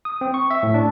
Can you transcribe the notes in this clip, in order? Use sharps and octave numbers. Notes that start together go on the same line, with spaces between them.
D#6
C4
C#6
E5
A2
D4